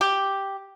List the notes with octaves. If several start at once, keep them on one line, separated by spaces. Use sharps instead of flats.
G4